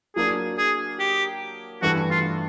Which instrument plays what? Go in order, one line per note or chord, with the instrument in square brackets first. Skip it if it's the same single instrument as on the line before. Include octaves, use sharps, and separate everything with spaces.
[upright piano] F#3 A#3 D4 [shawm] G#4
[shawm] G#4
G4
[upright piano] G2 E3 A3 [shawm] F#4
[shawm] F4